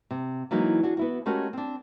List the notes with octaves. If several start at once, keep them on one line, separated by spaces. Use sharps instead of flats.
C3
E3 F#3 G#3 A#3 D#4
D4 F#4 G#4
B3 E4 F#4
G#3 A3 C#4 F#4 G4 A#4
C4 D4